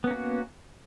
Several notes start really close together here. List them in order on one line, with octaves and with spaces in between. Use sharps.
B3 C#4 A#3 F#4